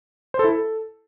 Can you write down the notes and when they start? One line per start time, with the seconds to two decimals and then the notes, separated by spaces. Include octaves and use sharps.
0.34 C5
0.39 A4
0.44 E4
0.49 A4